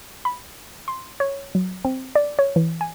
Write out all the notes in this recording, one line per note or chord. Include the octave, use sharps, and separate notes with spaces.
B5
C6
C#5
F#3
C4
D5
C#5
E3
G#5